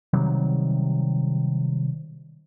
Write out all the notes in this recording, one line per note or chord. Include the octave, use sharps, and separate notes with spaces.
C3 D#3 F#3 G3